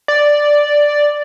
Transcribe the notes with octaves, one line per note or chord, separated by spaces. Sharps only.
D5